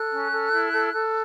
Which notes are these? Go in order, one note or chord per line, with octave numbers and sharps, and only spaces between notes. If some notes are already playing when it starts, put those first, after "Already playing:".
Already playing: A4 F#6
C#4
A4
E4
A4
A4